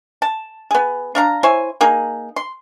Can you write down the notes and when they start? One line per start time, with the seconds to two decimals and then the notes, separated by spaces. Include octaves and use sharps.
0.22 A5
0.71 B3 G#4
1.15 D4 F5 A#5
1.43 E4 C5 C#5 G#5
1.81 A#3 D#4 G#4
2.36 C6